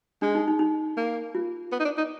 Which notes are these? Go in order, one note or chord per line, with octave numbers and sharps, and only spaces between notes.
G#3 D4
D#4
D#4
D#4
A#3
F4
B3
D#4
D4
D#4